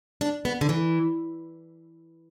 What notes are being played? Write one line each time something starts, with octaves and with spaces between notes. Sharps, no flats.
D4
B3
D3
E3